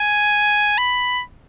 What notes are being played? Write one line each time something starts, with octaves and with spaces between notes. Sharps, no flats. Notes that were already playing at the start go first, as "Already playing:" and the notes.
Already playing: G#5
B5